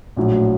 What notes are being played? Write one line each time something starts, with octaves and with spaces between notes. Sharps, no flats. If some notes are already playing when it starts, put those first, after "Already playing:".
A#1 A2 F#3